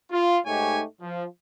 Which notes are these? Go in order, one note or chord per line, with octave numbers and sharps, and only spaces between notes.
F4
G#2 A3 D#4 G4 C#5 G#5
F3